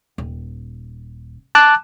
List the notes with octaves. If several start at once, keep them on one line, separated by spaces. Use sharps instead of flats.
D#1
A5 D6 F#6